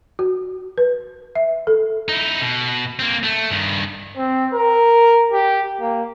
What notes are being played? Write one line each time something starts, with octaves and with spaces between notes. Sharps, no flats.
F#4
B4
E5
A4
D#4 E4
B2
A#3 C4
A3
G2 D#3
C4
A#4
G4
A#3